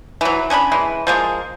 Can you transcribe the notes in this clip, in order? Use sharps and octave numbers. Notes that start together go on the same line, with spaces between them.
E3 F#3
C#4 D4 E4 B5
E3 G#3
F3 G#3 A#3